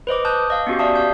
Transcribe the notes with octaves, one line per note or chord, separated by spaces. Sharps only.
B4 C5 D#5 D6
A5 D#6 F#6 G6
D#5 F5
B3 C#4 F#4 G4
D5 E5 F5 A5 D#6
G4 F5 G6